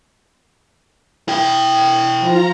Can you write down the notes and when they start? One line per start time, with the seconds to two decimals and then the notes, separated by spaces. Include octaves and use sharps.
1.28 E4 G5
2.19 F3 F4 A#5